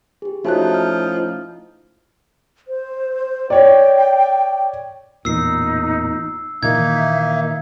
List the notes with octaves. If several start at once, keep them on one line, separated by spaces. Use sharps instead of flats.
G4 G#4
F3 A3 C#4 D#4 E4 F#4 A5 F#6
F6
C5
C#5 D5 G5
A1 E2 A#2 D#4 E6 C7
A#2 D#3 E3 A#3 D#4 E5 G#6